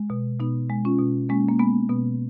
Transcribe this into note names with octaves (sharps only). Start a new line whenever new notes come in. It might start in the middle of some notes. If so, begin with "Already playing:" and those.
Already playing: G#3
B2
B2 B3 D#4
G#3
C#4 F4
B2
G#3 A#3 C#4
A#3
G#3 B3
B2 B3